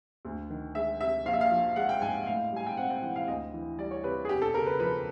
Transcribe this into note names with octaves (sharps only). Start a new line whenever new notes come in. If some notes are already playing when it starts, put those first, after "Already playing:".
D2
D#3
G#3 E5
C3 E5
A#1 F5
E5
F5
F3
G#3 F#5
G5
G#2 G#5
A2 F5
G3 G#5
G5
C4 F#5
G5
E3 F#5
F5
D2 D#5
E3
G3 D5
C#5
C3 B4
G#4
E1 G4
A4
C#3 A#4
B4
F3 B4